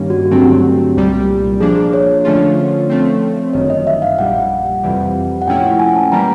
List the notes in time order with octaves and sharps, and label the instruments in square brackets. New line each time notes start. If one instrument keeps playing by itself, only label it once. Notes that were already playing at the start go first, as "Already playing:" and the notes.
Already playing: [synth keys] G2 D#3 G3 A#3 C#4
[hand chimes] F#4
[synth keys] G2 D3 F#3 A3 C4 [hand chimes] G4
[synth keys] C2 A#2 G3
[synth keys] F3 A#3 D4 [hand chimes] G#4
[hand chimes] C#5
[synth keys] D3 F3 A3 C#4 F4
F3 A3 C4
[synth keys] G1 F#2 D#3 [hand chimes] C#5
[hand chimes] D#5
E5
F5
[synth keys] A#1 A#2 G3 [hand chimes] F#5
[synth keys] F2 C3 E3 G3
[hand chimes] F#5
[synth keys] A#2 F3 A3 C#4 E4 [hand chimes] G5
[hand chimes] F#5
G#5
A5
[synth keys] E3 G3 A#3 [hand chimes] A#5